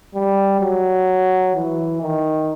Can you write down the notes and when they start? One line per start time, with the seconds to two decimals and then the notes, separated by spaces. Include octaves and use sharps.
0.15 G3
0.61 F#3
1.55 E3
2.02 D#3